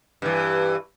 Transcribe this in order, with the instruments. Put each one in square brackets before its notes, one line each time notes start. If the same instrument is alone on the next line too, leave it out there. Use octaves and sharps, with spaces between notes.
[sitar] G2 E3